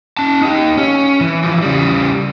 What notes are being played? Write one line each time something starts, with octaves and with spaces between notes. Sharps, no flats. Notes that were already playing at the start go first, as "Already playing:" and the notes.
C#4 A5
D#4 G4
C#4
E3
E3 F3
C#3 G3